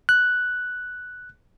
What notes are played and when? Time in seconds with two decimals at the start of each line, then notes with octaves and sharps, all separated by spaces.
0.09 F#6